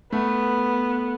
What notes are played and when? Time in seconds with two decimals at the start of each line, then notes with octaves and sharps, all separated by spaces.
0.12 A3 B3